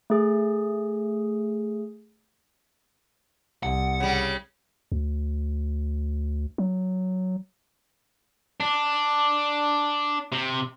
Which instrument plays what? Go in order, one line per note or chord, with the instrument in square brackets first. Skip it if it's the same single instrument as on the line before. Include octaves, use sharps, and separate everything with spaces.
[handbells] A3 G#4
[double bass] C2 [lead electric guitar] F#5
[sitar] C#3 G3
[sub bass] D2
F#3
[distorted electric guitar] D4
C3